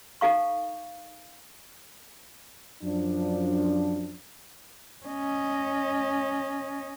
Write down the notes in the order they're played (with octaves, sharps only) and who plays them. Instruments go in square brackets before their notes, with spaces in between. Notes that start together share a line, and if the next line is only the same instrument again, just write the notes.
[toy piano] D#4 A4 F5 C#6
[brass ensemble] F#2 F3 D4
[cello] C#4 D#5